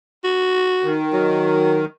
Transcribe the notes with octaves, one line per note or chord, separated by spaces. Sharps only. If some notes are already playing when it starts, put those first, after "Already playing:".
F#4
D#3
F#3